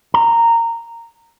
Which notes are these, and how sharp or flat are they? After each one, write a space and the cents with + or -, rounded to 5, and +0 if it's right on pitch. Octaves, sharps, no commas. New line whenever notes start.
A#5 -10